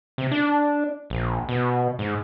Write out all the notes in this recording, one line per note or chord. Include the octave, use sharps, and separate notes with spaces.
C3
D4
A#1
B2
G#2